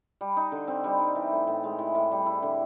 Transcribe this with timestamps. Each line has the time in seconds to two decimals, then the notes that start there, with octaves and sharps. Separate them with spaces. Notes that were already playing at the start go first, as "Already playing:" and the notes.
0.21 G3
0.37 D#4
0.52 D3
0.67 C4
0.84 G3
0.99 D#4
1.15 E3
1.32 A2
1.47 A2
1.63 G#3
1.79 E3
1.95 A2
2.11 G3
2.26 E4
2.43 D3